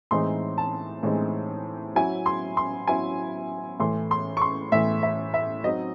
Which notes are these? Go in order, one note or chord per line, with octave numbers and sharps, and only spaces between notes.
A2 E3 G#3 C4 D#4 C6
A5
A2 E3 G#3 C4 D#4
F#3 C#4 E4 G#5
C6
C6
F#3 C#4 E4 G#5
A2 E3 A3 C6
C6
C#6
C6
A2 E3 A3 E5
E5
E5
F#3 C4 D#4 D#5